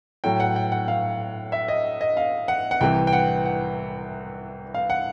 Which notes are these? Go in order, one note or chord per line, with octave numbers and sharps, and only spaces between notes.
A2 F#3 G5
F#5
G5
F#5
F5
E5
D#5
D#5
F5
F#5
F#5
C2 C3 E3 G5
G5
F#5
F#5
F5
F#5